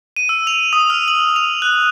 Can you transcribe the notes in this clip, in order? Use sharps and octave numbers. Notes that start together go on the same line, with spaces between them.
D#7
E6
F7
D#6
F6
F#7
F7
F#6